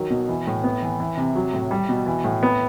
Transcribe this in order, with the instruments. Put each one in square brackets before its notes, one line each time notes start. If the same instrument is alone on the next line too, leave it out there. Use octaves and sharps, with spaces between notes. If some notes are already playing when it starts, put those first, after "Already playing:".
Already playing: [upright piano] D#3 F#3
B2
E3
A2
B3
E3
E3
C3
F#3
A2
G3
B2
E3
A2
B3